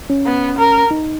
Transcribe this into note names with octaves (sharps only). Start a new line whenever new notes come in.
C#4
B3
A#4
D#4